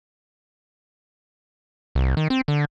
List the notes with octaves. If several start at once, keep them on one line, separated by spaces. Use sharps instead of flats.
C2
D#3
C4
D3